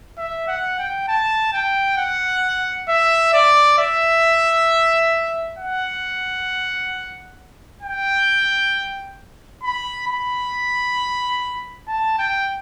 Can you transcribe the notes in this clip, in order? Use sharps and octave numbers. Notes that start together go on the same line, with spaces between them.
E5
F#5
G5
A5
G5
F#5
E5
D5
E5
F#5
G5
B5
B5
A5
G5